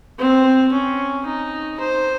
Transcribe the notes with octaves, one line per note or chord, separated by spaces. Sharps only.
C4
C#4
D#4
C5